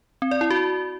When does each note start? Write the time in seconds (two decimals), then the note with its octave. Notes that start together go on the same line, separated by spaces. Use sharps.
0.22 C4
0.31 D5
0.41 E4
0.50 F#4